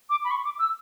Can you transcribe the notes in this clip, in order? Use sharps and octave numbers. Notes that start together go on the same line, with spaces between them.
D6
B5
C#6
D6
E6